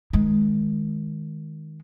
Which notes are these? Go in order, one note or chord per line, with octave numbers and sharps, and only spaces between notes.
D#3 G#3